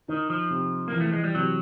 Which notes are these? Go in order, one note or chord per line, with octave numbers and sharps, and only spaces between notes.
D#3 D#4
F3
C3
E3 A#3
A3
G#3
G3
C3 F#3